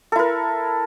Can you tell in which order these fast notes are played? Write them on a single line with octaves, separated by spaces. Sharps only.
A4 E4 A#4